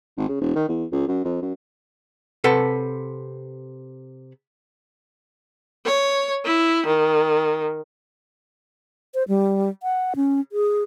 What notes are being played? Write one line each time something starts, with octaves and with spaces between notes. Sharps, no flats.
G#1
C#3
E1
D#3
E2
C#2
F#2
F2
F#2
C3 A4 B4 F#5 A5
C#5
E4
D#3
C5
G3
F#5
C#4
G#4